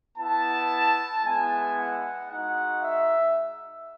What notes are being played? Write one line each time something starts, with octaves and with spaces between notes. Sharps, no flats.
B3 E4 A5
G#3 B3 E4 G#5
F#5
G#3 D#4 F#4 F#5
E5